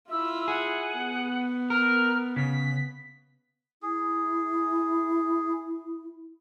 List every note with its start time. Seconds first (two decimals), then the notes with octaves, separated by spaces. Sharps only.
0.11 E4 F4 E6
0.48 G#4 F#5
0.97 B3
1.70 A#4 F6
2.36 C#3 B6
3.82 E4 G#4